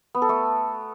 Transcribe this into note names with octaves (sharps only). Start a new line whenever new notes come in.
B3
A4
A3